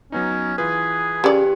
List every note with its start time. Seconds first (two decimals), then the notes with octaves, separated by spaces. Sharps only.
0.12 F#3 B3 C#4 D#4
0.58 E3 F4 G#4 B4
1.24 C#3 G4 D5